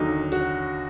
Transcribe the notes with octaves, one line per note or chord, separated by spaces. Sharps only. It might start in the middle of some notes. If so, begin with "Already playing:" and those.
Already playing: D#2 D3 F#3 D#4
F#4